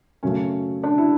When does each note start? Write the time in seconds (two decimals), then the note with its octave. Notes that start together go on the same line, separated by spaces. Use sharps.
0.23 F#2 C#3 F#3 A3 C#4
0.83 D4
0.98 E4